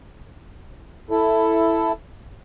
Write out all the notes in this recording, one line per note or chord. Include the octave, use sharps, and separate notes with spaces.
E4 A4